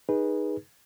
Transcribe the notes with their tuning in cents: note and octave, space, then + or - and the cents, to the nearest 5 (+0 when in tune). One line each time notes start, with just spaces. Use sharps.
D#4 +0 G#4 -15 B4 -20